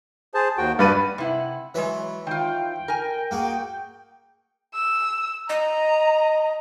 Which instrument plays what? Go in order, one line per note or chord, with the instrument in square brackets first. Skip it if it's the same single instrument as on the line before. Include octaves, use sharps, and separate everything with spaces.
[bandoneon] G#4 C5 A5
D#2 F#4 G5
[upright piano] G2 B4 D#7 [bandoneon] D5
[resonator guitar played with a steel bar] C3 E4 F#5
[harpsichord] E3 B4 C#5 [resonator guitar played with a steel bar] F#3 G#3
[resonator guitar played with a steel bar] D#3 F4 [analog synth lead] G5
[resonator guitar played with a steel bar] A#4 G#5
[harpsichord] A#3 F#4 G#4
[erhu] E6
[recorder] D#5 [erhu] A#5